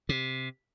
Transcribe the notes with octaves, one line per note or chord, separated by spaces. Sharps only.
C3